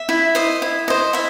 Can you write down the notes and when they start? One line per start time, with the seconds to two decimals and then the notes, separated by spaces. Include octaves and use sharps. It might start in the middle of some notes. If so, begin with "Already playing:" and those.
Already playing: E5
0.09 E4
0.35 C5 D#5
0.62 E4
0.88 C5 D#5
1.13 E4 E5